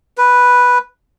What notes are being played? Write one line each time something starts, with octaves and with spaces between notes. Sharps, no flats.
B4